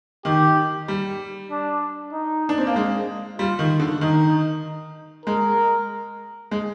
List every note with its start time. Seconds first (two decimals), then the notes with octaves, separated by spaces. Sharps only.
0.25 D#3 G4
0.88 G3
1.51 D4
2.13 D#4
2.49 D4
2.58 C4
2.67 A#3
2.76 G#3
3.38 G3 F4
3.59 D#3
3.80 D3
4.01 D#3 D#4
5.26 G#3 A#4
6.51 G#3